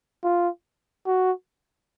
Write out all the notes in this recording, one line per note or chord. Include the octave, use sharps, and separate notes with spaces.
F4
F#4